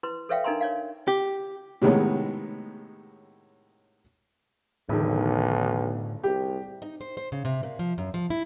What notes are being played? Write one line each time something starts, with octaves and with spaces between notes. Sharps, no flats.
E4 B4 C6
A4 B4 C#5 E5 F5 G5
D4 D#4 A#4 G#5 A#5 C6
C#5 D5 F5
G4
A2 C3 D#3 G#3 B3 C#4
E1 B1 A2 D3 D#3
C2 G4
D#4
C5
C5
C#3
C3
A#2
F3
F#2
F3
E4